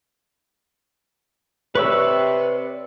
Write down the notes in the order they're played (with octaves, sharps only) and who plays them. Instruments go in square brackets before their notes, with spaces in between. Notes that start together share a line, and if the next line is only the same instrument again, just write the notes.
[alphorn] C3 [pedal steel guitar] B4 C#6 E6 [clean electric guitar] C#5 D5